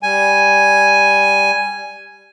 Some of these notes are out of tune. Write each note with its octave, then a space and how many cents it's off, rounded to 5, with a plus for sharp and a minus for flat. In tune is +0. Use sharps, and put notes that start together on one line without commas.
G3 +0 G#5 +0